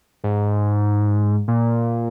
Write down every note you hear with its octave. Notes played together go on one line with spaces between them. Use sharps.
G#2
A#2